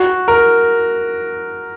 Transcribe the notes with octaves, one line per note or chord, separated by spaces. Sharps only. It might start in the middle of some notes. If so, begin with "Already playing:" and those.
Already playing: F#4
A#4